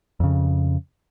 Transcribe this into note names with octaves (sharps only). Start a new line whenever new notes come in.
F2 C#3